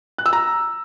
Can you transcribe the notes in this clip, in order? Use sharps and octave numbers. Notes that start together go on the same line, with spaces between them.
F#6
E6
A#5